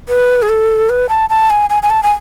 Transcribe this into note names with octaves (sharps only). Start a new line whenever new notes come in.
B4
G#4
A4
B4
A5
A5
G#5
G#5
G#5
A5
G#5